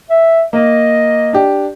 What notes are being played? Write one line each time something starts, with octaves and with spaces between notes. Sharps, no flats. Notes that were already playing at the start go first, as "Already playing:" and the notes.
E5
A#3 D#5
D4 G4